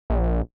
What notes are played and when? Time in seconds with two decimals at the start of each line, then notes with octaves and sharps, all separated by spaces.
0.10 A#1